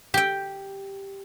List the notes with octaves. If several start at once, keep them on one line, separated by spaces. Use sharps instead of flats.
G4 G5